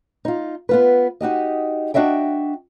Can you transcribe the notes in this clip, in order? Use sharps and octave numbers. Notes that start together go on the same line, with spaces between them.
D#4 F4
B3 F4 B4
D#4 F#4 G4 D#5
D4 F#4 D#5 E5 G5